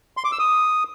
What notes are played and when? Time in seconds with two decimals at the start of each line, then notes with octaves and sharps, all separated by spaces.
0.17 C6
0.24 D6
0.32 E6
0.39 D#6